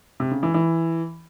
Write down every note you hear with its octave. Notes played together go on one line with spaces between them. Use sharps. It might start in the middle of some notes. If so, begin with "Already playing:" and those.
C3
C#3
E3
E3